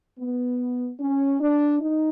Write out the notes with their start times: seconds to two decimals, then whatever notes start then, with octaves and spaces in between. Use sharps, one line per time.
0.19 B3
1.00 C#4
1.41 D4
1.81 D#4